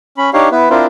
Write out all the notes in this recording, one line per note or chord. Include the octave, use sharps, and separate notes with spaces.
C#4 B5
D4 D#4 G4 C#5 F5
B3 E4 B4
C4 D4 E4 F4 A#4 C5